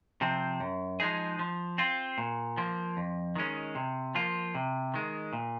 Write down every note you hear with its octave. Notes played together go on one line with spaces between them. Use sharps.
C3 F3 C4
F#2
F3 G#3 D#4 G#4
F3
C4 F4
A#2
F3 A#3
F2
D#3 G#3 C#4
C3
F3 A#3 F4
C3
D#3 G#3
A#2